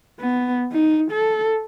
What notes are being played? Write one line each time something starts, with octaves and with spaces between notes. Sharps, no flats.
B3
D#4
A4